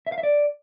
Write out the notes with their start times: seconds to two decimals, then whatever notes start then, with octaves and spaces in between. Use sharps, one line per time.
0.07 E5
0.12 F5
0.18 E5
0.23 D5